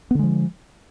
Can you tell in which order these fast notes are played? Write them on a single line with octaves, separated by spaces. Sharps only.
B3 D3 G#3 F3